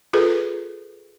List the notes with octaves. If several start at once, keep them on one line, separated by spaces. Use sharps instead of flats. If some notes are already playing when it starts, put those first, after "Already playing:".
F4 G#4 A4 B4